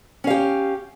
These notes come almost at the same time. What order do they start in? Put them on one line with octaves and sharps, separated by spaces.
C#4 F5 G4